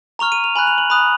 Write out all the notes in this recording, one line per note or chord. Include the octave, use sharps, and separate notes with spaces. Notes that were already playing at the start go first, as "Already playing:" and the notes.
A#5 C#6 F6 F7
D#7
F7
G#5 B5 F#6 F#7
F7
F#7
B5 D#6 F#6 F7